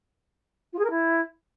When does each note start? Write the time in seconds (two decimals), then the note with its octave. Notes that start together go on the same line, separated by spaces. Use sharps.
0.73 F4
0.79 G#4
0.84 A#4
0.90 E4